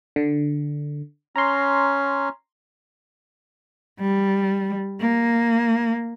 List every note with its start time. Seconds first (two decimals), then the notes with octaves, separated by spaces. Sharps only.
0.16 D3
1.36 C#4 A#5 C6
4.00 G3
5.00 A#3